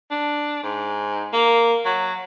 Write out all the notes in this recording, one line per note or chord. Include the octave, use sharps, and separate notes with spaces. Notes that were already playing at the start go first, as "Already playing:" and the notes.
D4
G#2
A#3
F#3